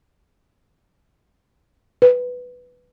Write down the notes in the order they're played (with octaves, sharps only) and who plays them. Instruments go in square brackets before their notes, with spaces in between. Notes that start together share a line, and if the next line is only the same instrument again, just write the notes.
[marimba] B4